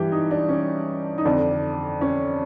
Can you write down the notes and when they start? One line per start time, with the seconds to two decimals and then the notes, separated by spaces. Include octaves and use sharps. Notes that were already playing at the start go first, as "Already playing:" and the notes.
Already playing: G2 E3 G4
0.12 D#4
0.31 D4
0.49 C#4
1.18 D#4
1.25 F2 D3 D4
2.01 C#4